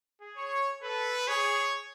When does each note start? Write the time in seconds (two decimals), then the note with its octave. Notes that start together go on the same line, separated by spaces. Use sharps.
0.21 G#4
0.37 C#5
0.82 A4 B4
1.28 G#4 C#5